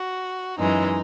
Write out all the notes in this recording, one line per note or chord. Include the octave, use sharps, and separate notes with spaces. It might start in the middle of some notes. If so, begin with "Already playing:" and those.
Already playing: F#4
F#2 E3 G#3 D#4